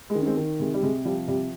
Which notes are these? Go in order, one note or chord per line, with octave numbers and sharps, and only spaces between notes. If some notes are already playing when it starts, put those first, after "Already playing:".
G#3
D#3
C#4
G#3 C4
D#3
C3 G#3
G3
C3 G#3
F3 G3
C3 G3